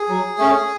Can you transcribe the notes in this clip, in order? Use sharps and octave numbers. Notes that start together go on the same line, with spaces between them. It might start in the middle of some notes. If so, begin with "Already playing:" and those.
Already playing: G#4
F#3
A3 C#4